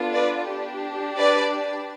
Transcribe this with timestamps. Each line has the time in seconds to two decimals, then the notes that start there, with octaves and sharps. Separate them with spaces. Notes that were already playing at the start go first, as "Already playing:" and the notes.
Already playing: B3 D4 F4 A4
0.14 B4 D5
0.48 D4 G4
1.17 B4 D5